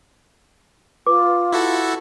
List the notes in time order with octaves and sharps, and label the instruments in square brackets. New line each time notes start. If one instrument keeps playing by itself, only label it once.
[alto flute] F4 [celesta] B4 D6
[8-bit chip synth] E4 F#4 A4